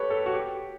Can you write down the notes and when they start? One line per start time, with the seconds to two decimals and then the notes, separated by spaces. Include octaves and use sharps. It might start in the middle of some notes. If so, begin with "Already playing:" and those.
Already playing: G4 A4 B4 C#5
0.10 A4
0.26 F#4
0.34 G4